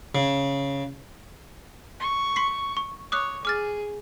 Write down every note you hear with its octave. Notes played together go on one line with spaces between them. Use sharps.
C#3
C#6
C6 B6 C7
C#6
C#5 D6 D#6 F#6
G#4 D6 F6 A6